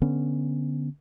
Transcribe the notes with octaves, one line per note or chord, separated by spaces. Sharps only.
D3 B3 C#4